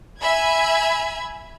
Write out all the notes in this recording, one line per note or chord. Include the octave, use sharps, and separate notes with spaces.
E5 G#5 B5 E6 G#6